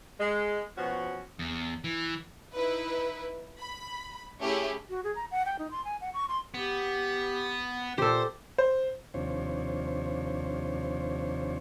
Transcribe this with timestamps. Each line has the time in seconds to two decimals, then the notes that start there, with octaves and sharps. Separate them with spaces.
0.19 G#3
0.77 B2 F3 C#4 F#4
1.39 E2
1.84 E3
2.55 D#4 E4 B4
3.59 B5
4.41 A3 C#4 E4 G4 G#4
4.90 F#4
5.04 G#4
5.16 A#5
5.31 F#5
5.46 G5
5.59 D#4
5.71 C6
5.85 G#5
6.01 F#5
6.14 C#6
6.29 C6
6.54 B3 G4
7.98 A#2 G4 A4 C5
8.58 C5
9.14 D#2 C3 F3 D4 C5 C#5